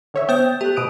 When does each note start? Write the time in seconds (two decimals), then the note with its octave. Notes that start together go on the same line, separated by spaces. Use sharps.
0.14 D3 C#5 E5
0.29 B3 C5 G5 G6
0.61 A3 G4 F#6
0.76 B2 D#6 D7